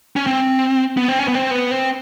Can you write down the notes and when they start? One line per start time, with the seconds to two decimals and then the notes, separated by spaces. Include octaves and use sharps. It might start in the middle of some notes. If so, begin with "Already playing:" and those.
0.16 C#4
0.27 C4
0.97 B3
1.08 C4
1.19 C#4
1.28 B3
1.35 C4
1.51 B3
1.71 C4